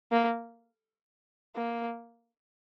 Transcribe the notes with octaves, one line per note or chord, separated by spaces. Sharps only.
A#3
A#3